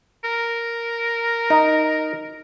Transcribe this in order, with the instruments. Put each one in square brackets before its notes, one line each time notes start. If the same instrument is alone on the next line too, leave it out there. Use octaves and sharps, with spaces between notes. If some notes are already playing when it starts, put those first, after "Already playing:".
[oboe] A#4
[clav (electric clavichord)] D#4